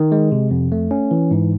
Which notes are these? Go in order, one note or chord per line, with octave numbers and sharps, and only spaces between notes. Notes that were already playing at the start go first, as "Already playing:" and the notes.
Already playing: D#3
G#3
C3
F2
A3
C#4
E3
G#2